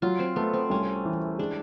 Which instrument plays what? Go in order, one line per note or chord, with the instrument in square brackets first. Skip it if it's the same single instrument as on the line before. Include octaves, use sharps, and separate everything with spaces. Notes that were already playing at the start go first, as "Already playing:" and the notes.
[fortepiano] F#3 [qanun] F4
[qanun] C4
[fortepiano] A3 [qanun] B3
[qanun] C4
[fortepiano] C2 [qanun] C#4
[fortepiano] E3
[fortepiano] G#3 [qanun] D4